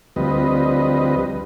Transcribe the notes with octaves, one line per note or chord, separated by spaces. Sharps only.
D2 F3 G3 C4 B4 D#5